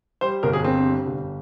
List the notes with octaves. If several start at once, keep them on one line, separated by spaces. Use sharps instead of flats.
G3 C5
G1 A#4
G#4
G2 C4
G3
G1